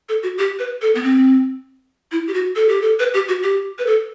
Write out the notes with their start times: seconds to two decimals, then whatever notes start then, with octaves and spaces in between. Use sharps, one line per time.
0.09 A4
0.23 F#4
0.38 G4
0.59 B4
0.82 A4
0.95 B3
1.03 C4
2.12 E4
2.28 G4
2.34 F#4
2.56 A4
2.69 G4
2.81 A4
2.99 B4
3.14 G4
3.28 F#4
3.43 G4
3.79 B4
3.87 A4